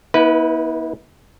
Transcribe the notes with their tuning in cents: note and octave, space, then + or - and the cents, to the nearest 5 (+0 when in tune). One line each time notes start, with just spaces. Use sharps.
B3 -45 E4 -40 B4 +0